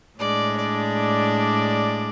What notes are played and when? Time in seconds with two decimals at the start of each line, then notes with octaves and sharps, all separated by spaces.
0.18 A2 G#3 D4 D5
0.57 D5